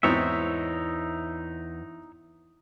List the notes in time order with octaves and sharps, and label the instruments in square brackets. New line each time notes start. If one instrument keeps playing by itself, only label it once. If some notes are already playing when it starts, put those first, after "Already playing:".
[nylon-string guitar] E2 [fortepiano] G#2 C4 E4 [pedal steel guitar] D#4 C#5 E5